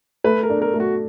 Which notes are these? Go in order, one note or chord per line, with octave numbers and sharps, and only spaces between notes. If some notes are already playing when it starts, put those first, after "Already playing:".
A3 B4
A#4
D4
A#4
A3
F#4